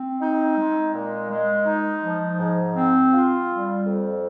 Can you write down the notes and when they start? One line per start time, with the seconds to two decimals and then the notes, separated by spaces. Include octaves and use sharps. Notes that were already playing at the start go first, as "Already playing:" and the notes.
Already playing: C4
0.20 D#4
0.57 G#3
0.93 A#2
1.30 G#3
1.66 D#4
2.02 F3
2.39 G#2
2.75 C4
3.12 F4
3.48 G3
3.85 F2